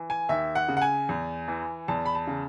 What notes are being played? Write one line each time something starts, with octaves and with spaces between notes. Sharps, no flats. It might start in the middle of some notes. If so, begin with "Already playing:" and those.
Already playing: E3
G#5
D#2 E5
F#5
C#3
F#5
G#5
E2
E3
E2 A5
B5
A5
C#3